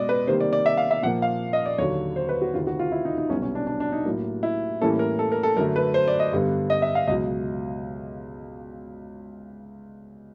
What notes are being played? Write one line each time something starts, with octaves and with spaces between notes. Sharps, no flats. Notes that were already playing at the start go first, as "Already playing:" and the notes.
Already playing: B2 G#3 B3 D5 D#5
B4
C3 D#3 G3 A#3 C5
D5
D5
E5
F5
E5
A#2 F3 A#3 F#5
F5
D#5
D5
D#2 D3 F#3 C#5
C5
B4
F#4
D2 C3 D#3 F4
F#4
F4
E4
D#4
D#4
C2 B2 F#3 B3 C#4
C#4
D4
D4
D4
D#4
A2 F#3 A#3
E4
A2 E3 G3 A#3 C#4 A4
A#4
A4
A#4
A4
F#2 D3 F#3 A3 A#4
B4
C5
D5
D#5
G2 D3 G3 B3
D#5
E5
F5
C#2 B2 F#3 D#5